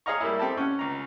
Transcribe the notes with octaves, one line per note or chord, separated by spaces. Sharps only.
G#4 C#5 D#5 F5 A#5 C#6
G3 A#3 E4
C4 G4 A4 A5
C#4 F#5
C#2 A#5